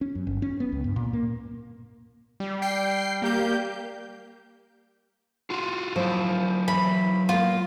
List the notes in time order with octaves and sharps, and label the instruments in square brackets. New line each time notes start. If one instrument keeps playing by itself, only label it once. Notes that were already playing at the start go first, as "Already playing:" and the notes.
[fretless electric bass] C#4
F#2
G1
C#4
B3
C#2
G2
A#2
A#3
[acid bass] G3
[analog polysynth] G5 C7
A#3 G4 G6
[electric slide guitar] F4 F#4
[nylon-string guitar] F3 [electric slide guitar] F#3 E4
[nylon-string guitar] E3 [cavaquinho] B5
[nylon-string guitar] A#3 B3 [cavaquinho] F4